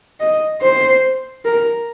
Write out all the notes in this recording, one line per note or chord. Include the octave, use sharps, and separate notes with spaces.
D#5
C5
A#4